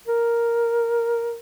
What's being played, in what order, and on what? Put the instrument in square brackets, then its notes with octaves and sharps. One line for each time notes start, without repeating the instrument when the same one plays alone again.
[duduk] A#4